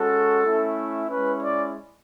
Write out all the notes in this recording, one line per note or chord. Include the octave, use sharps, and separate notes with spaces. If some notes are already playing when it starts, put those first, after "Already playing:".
Already playing: G#3 C#4 F#4 A4
A3 C#4 E4
G#3 C#4 E4 B4
D5